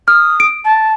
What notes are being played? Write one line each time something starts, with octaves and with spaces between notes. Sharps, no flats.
D#6 F6
D7
A5